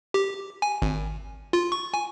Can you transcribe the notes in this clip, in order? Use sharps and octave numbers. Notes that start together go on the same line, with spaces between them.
G4
G#5
G#1
F4
C#6
G#5